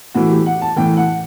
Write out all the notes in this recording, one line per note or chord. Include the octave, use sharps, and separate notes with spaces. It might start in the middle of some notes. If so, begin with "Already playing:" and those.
A2 E3 F#4
G4
F#5
A5
A2 E3 G5
F#5